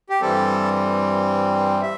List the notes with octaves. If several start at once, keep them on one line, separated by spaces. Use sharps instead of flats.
G4
G2 E3 G3 C4 A4
E5